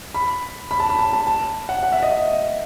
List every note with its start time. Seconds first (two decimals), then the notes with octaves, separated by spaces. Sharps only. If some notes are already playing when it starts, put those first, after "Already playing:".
0.14 B5
0.71 B5
0.80 A5
0.90 B5
0.99 A5
1.13 A5
1.27 A5
1.69 F#5
1.83 F#5
1.92 E5
2.03 D#5
2.12 E5